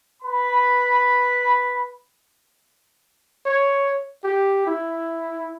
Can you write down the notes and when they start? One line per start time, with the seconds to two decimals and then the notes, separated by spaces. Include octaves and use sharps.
0.23 B4 B5
3.46 C#5
4.24 G4
4.67 E4